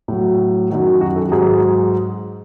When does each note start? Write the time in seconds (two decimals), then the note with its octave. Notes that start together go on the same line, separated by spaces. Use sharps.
0.08 A2 F#3
0.70 F#2 D#3 F#3
1.01 F#4
1.16 A4
1.32 G#2 F#3 G#4